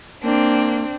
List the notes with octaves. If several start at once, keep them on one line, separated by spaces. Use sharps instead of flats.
A#3 C4 D4